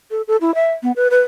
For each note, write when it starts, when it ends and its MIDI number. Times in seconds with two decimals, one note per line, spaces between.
0.11 0.22 69
0.28 0.37 69
0.41 0.54 64
0.55 0.72 76
0.83 0.92 59
0.96 1.08 71
1.11 1.21 71